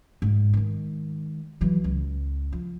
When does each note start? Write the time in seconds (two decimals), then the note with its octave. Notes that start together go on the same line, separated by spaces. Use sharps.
0.22 G#2
0.53 D#3 G#3
1.61 E3 F#3
1.84 C#2
2.52 F3